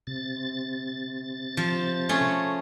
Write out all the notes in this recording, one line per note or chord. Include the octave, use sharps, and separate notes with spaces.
C3 A6
F3
A3 C#4 G#4